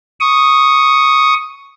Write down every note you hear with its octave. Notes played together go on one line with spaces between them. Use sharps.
C#6 D#6